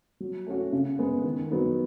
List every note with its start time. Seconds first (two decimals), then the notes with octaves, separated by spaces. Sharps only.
0.20 F#3
0.47 A3 C#4 F#4
0.72 C#3
0.99 G#3 B3
1.24 D#3
1.51 F#3 B3 D#4